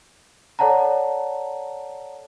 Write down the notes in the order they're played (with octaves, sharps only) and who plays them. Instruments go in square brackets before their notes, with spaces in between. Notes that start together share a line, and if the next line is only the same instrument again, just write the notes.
[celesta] A4 C#5 D5 F#5 A5 A#5